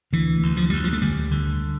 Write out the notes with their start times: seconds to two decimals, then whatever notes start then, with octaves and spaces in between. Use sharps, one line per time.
0.13 D2 E3
0.42 D2
0.57 F3
0.70 D2 G3
0.84 F3
0.93 A3
1.02 D2 G3
1.31 D3